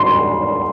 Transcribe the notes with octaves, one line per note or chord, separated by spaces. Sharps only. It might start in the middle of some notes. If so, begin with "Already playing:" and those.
Already playing: C6